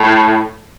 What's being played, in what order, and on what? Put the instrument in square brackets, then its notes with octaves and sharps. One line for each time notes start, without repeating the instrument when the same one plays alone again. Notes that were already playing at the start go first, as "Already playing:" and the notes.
Already playing: [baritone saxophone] A2